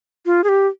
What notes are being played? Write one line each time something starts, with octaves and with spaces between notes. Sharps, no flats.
F4
G#4
G4